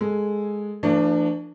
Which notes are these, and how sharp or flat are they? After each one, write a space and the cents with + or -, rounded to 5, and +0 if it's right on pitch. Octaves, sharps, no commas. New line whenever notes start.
G#3 +0 A4 +0
F3 -40 A3 +45 D4 +15